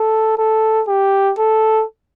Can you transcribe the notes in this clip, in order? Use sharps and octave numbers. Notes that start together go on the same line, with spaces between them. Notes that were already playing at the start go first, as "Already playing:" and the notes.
Already playing: A4
A4
G4
A4